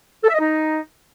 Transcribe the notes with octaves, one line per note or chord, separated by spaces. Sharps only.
A4
E5
D#5
D#4